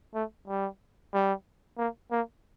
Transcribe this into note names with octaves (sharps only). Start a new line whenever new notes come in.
A3
G3
G3
A#3
A#3